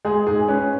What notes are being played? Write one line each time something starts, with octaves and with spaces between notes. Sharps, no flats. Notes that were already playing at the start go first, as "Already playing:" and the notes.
G#3 G#4
G#2 G#4
C#4 B4